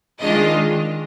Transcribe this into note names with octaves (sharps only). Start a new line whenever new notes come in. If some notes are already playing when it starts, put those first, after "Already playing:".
D#3 G#3 D4 F4 D#5